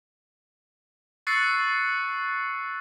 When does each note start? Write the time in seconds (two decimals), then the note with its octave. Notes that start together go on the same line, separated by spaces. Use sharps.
1.27 C#6 E6 F#6 A6 C7 C#7